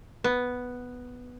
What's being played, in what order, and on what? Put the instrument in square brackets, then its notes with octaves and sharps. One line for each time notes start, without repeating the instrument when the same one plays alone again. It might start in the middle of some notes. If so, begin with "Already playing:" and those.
[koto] B3